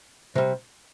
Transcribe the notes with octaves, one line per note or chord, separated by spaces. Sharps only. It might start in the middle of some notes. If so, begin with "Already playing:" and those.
C3 G3